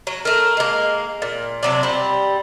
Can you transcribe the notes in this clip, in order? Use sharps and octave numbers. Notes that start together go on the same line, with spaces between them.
F#3 C#4
A3 A#4
G#3 A#3
A#2
C3 F#3 D4
G3 C4